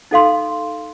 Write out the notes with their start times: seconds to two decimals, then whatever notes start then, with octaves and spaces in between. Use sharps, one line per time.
0.11 D#4 A4 F5 C6